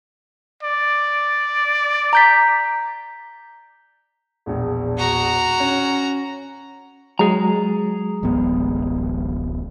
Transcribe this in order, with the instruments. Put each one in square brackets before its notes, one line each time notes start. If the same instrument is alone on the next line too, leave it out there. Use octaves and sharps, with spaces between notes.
[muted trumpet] D5
[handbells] A#5 G6 B6
[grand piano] E1 A#1
[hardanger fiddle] F#4 A#5
[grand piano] C#4
[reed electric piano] F#3 G#3 [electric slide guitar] G#4 A#5
[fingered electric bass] D1 A1 B3